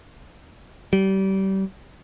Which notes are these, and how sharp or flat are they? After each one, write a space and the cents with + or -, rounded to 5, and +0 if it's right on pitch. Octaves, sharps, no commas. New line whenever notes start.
G3 -30